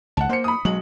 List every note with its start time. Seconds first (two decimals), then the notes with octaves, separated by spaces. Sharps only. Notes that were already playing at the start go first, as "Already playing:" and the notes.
0.17 C#2 F#5 A5
0.29 A#3 C5 C#7
0.44 B5 D#6
0.65 B1 F#3 G#3 F#7